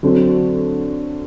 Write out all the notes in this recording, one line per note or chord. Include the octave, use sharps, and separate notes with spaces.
D3 F#3 C4 F#4